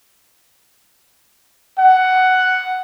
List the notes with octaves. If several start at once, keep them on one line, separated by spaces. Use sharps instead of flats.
F#5